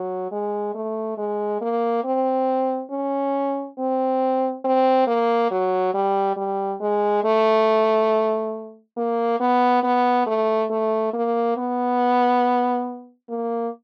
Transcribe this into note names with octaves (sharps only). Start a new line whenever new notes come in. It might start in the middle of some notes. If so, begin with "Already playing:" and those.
Already playing: F#3
G#3
A3
G#3
A#3
C4
C#4
C4
C4
A#3
F#3
G3
G3
G#3
A3
A#3
B3
B3
A3
A3
A#3
B3
A#3